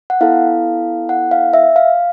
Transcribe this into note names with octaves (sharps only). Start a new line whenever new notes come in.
F#5
B3 E4 A4 F5
F#5
F5
E5
F5